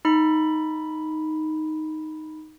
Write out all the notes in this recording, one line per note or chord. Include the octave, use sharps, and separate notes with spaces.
D#4 B5